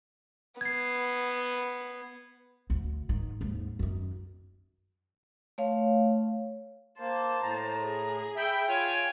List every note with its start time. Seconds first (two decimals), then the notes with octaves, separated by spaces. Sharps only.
0.61 B3 G#6 C7
2.70 D2
3.09 G#2 D#3
3.41 D#2 G#2
3.79 F#2 D#3
5.58 A3 C#5 F5
6.99 A#3 C5 A5
7.42 A2 A#5
7.81 G#4
8.36 E5 G5 B5
8.68 F4 C#5 G5 G#5